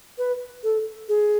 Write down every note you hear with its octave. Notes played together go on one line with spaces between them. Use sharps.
B4
A4
G#4